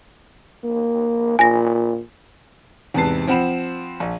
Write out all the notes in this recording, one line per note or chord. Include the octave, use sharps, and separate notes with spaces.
A#3
A#2 G#5 A#6
E2 G#2 C3 B4 A5 C7
F3 C4 F#5 B5 E7
A#1